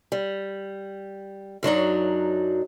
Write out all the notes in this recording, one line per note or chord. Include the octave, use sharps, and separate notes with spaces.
G3
F#2 F#3 D4 D#4